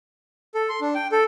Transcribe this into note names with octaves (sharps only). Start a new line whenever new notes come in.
A4
C6
D4
G5
A4